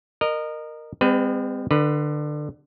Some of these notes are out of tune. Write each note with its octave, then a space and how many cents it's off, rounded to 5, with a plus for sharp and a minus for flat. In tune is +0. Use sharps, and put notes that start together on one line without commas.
A#4 -5 D#5 -25
G#3 -45 C4 -30 B4 +25
D3 +25 B4 +0